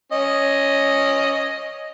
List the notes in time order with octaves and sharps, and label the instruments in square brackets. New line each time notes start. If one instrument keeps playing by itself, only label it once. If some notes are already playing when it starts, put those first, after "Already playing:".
[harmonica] C#4 D#5